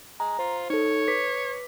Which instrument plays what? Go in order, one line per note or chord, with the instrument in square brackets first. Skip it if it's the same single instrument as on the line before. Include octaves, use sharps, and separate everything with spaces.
[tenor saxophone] G#3 [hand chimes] A#5
[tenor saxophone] F4 [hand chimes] C5
[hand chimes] D#4 A4 [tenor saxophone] C#5
[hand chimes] B4 D6 B6